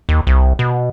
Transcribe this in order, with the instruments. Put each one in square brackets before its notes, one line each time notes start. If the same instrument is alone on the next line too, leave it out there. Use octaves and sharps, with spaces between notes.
[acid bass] D#2
C2
B2